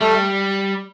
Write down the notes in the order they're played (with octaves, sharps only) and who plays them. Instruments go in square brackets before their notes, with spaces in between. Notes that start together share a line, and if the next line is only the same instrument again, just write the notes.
[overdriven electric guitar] G3 [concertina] A3